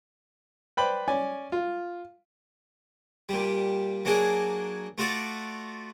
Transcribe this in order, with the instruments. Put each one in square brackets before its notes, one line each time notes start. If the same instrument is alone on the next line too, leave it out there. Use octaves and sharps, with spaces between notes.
[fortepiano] B4 C5 D5 G5 B5
C#4 D5 G#5
F4
[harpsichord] A#2 G3
F#3 A#3 D4 G#4
A3 F4 F#4 D5